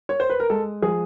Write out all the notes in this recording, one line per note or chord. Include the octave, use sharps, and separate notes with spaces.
C#5
C5
B4
A#4
G#3 A4
F3 G#4